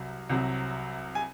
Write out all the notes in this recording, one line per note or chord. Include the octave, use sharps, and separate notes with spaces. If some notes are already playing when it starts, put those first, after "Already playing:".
Already playing: C2 C3 F#3
C2 C3 F#3
G#5